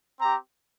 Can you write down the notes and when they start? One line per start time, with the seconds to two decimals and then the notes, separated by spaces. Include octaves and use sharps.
0.20 C4 G4 A#5